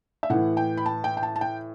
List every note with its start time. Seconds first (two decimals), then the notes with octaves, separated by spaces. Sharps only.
0.23 E5
0.30 A2 E3 F#5
0.57 G5
0.77 B5
0.86 A5
1.04 G5
1.17 G5
1.23 A5
1.36 A5
1.41 G5